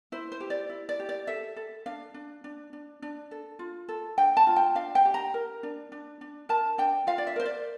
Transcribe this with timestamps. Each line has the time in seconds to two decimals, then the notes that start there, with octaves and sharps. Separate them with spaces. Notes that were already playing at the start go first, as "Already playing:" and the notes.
0.12 E4 C5
0.32 C5
0.41 G4
0.50 D5
0.69 E4
0.89 D5
1.00 G4
1.09 D5
1.27 A4 E5
1.56 A4
1.86 D4 F5
2.14 D4
2.44 D4
2.73 D4
3.02 D4
3.31 A4
3.59 F4
3.88 A4
4.18 D4 G5
4.37 A5
4.47 F4
4.56 G5
4.75 D4 F5
4.95 G5
5.05 G4
5.14 A#5
5.34 A#4
5.63 D4
5.92 D4
6.21 D4
6.49 A#4 A5
6.78 D4 G5
7.07 F4 F5
7.18 D5
7.27 E5
7.36 A#4 C5
7.46 D5